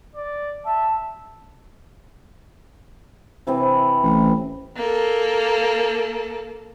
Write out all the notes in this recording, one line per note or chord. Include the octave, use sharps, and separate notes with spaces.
D5
E5 A5
C3 E3 C4
A1
A#3 A4